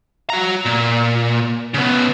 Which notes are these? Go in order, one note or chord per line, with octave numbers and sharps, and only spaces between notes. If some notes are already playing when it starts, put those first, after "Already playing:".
F#4 A#5
A#2
C#3 B3